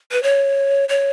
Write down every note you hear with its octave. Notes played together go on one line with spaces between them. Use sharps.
B4
C#5
C#5